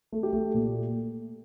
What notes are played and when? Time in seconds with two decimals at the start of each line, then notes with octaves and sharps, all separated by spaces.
0.12 A3
0.23 G4
0.33 A3
0.54 A#2